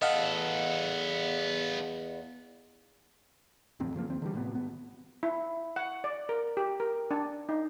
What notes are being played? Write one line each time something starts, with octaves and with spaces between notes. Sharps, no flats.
E2 B3 A4 D#5 F5 F#5
D1 A1 F2 C4
F#2 C#3 F3 A#3
D#2 C4
D3 E3 G3
A2 C3 B3
G#1 D#2 B3
E4
F#5
D5
A#4
G4
A#4
D4
D#4